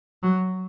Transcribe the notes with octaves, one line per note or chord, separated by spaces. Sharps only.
F#3